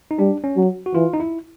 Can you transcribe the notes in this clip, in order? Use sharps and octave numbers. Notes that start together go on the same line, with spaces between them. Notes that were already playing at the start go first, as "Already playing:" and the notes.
D#4
G3 D4
C#4
F#3
F#4
E3 F4
D#4
E4